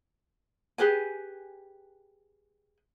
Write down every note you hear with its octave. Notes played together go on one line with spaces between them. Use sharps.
G4 G#4 B4 G#5